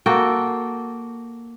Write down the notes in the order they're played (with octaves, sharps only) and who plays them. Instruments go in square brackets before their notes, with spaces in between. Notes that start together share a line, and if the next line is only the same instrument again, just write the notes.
[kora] A#3 F#4 A4 G5